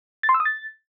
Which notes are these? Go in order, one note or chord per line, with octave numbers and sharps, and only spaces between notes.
A6
C6
E6
D#6
A6